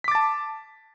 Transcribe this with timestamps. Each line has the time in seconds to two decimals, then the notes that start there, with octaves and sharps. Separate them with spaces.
0.04 B6
0.08 D6
0.11 A6
0.15 A5